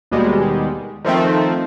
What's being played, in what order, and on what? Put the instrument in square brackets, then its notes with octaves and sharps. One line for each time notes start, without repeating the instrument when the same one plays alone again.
[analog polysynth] D#2 B2 G3 G#3
D#3 F3 A3 C4